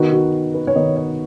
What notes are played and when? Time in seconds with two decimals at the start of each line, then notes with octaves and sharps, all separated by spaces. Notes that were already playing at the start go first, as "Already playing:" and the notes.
Already playing: D#3 B3 D#4 F#4
0.12 F#4
0.54 B4
0.67 C#5
0.75 D#3 B3 D#4 D#5
0.97 C#5